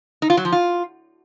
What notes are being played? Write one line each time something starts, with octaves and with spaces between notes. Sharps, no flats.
D#4
F4
F#3
F3
F4